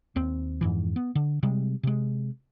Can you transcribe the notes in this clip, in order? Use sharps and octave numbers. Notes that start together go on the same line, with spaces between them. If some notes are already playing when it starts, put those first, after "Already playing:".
D#2 C4
F2 G#2 E3
B3
D3
C3 G3 G#3
C3 G#3